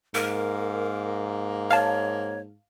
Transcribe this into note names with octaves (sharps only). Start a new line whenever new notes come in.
G#2 A#3 A#4
C#5 F5 A5